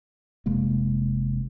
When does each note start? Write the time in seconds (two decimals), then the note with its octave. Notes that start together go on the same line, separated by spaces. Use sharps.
0.46 F1 C3 G#3 A#3